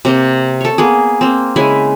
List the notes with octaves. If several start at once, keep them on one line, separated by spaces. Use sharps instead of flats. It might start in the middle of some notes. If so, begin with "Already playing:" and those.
C3 A#3 C6
A4 C#5
A#3 B3 G#4
A#3 C4
C#3 G#3 E4 G#5